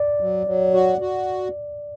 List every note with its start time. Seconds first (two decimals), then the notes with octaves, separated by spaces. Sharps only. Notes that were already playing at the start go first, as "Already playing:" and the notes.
Already playing: D5
0.20 F#3
0.47 F#3
0.74 F#4
1.01 F#4